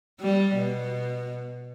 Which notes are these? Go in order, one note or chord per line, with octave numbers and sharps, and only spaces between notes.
G3
B2